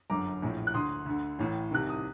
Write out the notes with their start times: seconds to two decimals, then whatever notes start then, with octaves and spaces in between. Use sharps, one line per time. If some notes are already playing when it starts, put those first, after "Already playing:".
0.10 G1 F#2 D3 A#5 D6
0.42 A#1 A2
0.67 F#6
0.74 D2 D3 C6 D#6
1.06 D2 D3
1.39 A1 A2
1.71 C2 C3 D#3 F#6
1.89 D#6